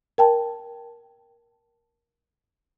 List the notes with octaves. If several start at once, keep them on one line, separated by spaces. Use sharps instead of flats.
A#4 G5 A5